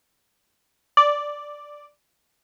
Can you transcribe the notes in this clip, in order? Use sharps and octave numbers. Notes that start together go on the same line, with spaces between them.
D5